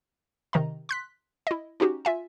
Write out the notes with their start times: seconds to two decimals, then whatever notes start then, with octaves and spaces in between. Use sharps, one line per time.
0.53 C3 D#3 D#5 A#5
0.89 C6 F#6 B6
1.47 E4 D#5
1.80 C#4 D#4 F#4 G4
2.05 F4 E5 G#5